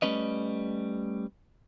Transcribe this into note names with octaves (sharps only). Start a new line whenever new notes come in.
G3 A3 C#4 B4 D#5